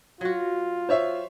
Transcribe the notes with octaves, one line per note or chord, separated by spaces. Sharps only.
F#3 F4 F#4
C5 C#5 E5